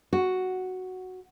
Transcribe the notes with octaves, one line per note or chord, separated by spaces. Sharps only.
F#4